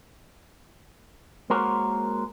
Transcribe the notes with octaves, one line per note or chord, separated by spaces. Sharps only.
G#3 A#3 F#4 A#4 C5 C#5